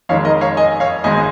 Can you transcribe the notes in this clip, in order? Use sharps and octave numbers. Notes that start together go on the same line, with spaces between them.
F2 D#3 G#3 C#5 F5
A#4 D#5
C#5 F5
D#5 G#5
C#5 F5
G#1 G#2 G#3 D#5 G#5